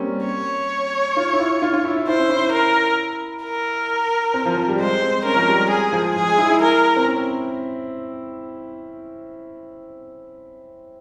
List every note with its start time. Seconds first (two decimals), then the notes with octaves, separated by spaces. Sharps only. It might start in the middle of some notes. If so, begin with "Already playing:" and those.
Already playing: G3 A#3 C4 C#4
0.26 C#5
1.17 F4
1.33 E4
1.39 F4
1.62 F4
1.73 F4
1.85 E4
1.96 E4
2.08 E4 C5
2.19 C#4
2.30 E4
2.52 A#4
3.43 A#4
4.34 C4
4.46 F3
4.57 F3
4.68 G3
4.79 G#3 C5
5.02 C4
5.25 C#4 A#4
5.36 F3
5.48 G3
5.59 G#3
5.70 G#3 G#4
5.92 F3
6.16 F3 G#4
6.27 G#3
6.38 E4
6.49 E4
6.62 A#4
6.96 C4
7.07 C#4